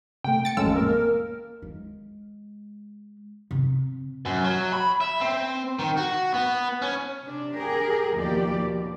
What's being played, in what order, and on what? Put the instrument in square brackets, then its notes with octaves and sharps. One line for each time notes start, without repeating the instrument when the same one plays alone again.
[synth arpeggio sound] C3 A3 [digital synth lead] G5
[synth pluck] A6 C#7
[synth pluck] A1 E6 [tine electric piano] F2 C#4 A4 [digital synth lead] G#3 [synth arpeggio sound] F5
[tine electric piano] A#3 [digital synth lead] A#4
[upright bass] G#3
C3
[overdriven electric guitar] F#2
F#3
B5
E5
C4
D#3
F#4
B3
C#4
[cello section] C3 D4
G4 G#4 A#4
D#2 B2 F3 A#3 G4 D5
B2